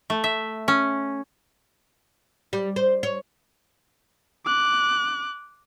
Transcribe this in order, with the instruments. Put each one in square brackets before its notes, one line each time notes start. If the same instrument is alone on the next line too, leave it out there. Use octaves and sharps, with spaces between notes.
[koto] A3
E5
C#4
[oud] G3
C5
C#5
[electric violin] D6 F#6